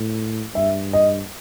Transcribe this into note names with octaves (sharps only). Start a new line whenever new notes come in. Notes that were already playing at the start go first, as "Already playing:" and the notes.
Already playing: A2
G2 E5
D#5